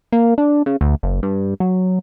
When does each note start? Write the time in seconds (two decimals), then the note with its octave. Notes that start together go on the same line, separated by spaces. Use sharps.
0.12 A#3
0.38 D4
0.66 C#3
0.81 D2
1.03 F#1
1.23 G2
1.60 F#3